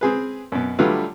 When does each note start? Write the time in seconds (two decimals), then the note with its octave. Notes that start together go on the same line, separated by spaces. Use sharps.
0.01 C4 G#4 B4
0.52 F#2 B2
0.79 D3 F#3 G3 A3 F4 B4